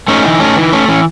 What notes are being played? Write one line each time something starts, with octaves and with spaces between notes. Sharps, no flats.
A3 C#4 D#4
E3
A3 C#4
E3
A3 C#4
E3 C#4